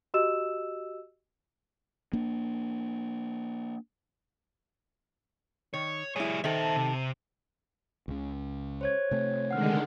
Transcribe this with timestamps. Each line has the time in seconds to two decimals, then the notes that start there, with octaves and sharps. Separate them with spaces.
0.14 F#4 G4 D#5 E6 E7
2.13 A#3 D4
5.74 D#3 C#5
6.16 G3 E4 G#4 C#5
6.44 D#3 A4 C5 E5
6.76 C3
8.08 C#2 C#3
8.81 C5 C#5 G#6
9.11 C3 A3
9.51 D3 D#3 G#3 F#5 F6